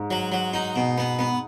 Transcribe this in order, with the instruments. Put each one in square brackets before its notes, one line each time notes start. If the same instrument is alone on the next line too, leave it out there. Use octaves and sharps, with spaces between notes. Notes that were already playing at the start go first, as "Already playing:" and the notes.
Already playing: [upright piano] G#2
[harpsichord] F#3
F#3
D#4
B2
B3
B3